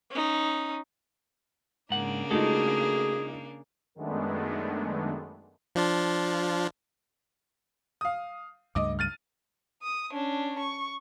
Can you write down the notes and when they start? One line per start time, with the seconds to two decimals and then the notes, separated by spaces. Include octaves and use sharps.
0.11 C#4 D#4
1.90 G#2 C#3 A#3 D4 F#5
2.31 G#3 A3 D#4 F4 F#4 G#4 A4
3.95 F#2 D#3 G#3 A3 B3 D4
5.75 F3 D4 F4
8.01 F5 D#6
8.75 C#2 G2 A3 D#5 D6
8.99 F6 A6 D#7
9.83 D#6
10.11 C#4 D4
10.59 C#6